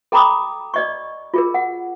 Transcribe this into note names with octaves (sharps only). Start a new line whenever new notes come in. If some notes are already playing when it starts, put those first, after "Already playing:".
A4 G5 A#5 B5 D6 D#6
D5 D#5 C#6
F4 G#4 A#4
F#5